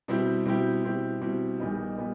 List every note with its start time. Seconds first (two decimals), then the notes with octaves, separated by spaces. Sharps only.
0.08 B2 G3 C4 E4 G4
0.45 B2 G3 C4 E4 G4
0.84 B2 G3 C4 E4 G4
1.21 B2 G3 C4 E4 G4
1.60 A#1 A#2 G3 B3 D#4
1.98 A#2 G3 B3